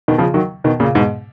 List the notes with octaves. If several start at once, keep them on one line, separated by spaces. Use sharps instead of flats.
B2 D#3
C#3 F3
D#3 F#3
B2 D#3
A#2 C#3
G#2 B2